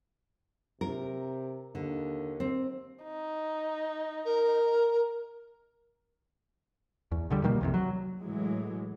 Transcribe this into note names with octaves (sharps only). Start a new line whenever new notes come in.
C3 A#4
D#2 D3
C4
D#4
A#4
E2
C#2 D3 G3
B2 D#3 G3 A#3
C2 F2 C3
F#3
A2 E3 F#3 G#3